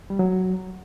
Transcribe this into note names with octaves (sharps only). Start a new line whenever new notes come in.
G3
F#3